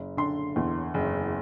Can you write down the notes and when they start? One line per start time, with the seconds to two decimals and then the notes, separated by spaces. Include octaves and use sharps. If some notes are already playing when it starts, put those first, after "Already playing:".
Already playing: F#1
0.17 D3 C6
0.56 E2
0.94 F#1